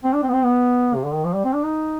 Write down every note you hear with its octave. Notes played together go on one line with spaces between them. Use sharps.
C4
D4
C4
B3
C4
B3
C3
D3
D#3
F3
G3
C4
D4
D#4